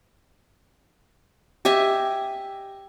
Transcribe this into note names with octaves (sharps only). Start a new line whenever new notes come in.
G4 D#5 E5 G#5